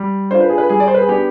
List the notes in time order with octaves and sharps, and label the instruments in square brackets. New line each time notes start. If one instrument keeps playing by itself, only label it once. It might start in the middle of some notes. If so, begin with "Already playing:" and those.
Already playing: [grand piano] G3
D4 F4 C5
B4
G#4
B4
G3 G#4
D5
C5
B4
G#4
B3 D4 G4